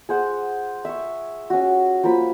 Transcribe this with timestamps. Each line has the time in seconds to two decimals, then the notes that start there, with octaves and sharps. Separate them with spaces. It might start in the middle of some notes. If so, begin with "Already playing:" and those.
0.09 G#4 C5 F#5
0.85 E5 C#6
1.50 C#4 F#4
2.03 F3 A#3 B5